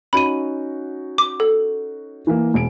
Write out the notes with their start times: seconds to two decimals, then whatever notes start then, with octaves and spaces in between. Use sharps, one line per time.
0.13 C#4 D#4 F#4 B5 D#7
1.18 D6
1.40 A4
2.27 E3 A#3
2.54 E1 D7